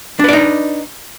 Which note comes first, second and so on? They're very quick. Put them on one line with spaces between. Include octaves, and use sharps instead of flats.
D4 B4 D5 D#4